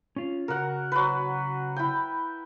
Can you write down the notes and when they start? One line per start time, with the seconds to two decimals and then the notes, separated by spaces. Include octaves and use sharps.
0.16 C#4 F4
0.48 C#3 F#4 A#4 F#5 A#5
0.92 F#3 B4
1.76 E4 G5